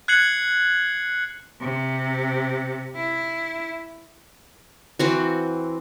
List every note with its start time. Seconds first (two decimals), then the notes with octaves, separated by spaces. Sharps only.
0.08 F#6 G#6 C7 C#7 F#7
1.60 C3
2.95 E4
4.99 E3 C4 F#4